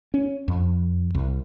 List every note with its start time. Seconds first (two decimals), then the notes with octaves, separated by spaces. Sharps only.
0.14 C#4
0.48 F2
1.15 C2